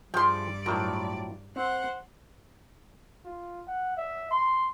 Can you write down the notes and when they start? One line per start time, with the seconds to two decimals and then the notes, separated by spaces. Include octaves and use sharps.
0.14 G2 F3 G#4 D5 E5 G5 C6
0.66 A2 F3 F#3 A#4
1.56 C4 C5 F#5
3.25 F4
3.67 F#5
3.97 E5
4.31 C6